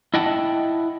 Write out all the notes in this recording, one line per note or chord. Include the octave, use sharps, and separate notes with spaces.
E4 D#5 F#5 G5 A5